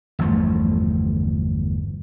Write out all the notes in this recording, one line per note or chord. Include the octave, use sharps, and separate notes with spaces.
G1 E2 F3 A3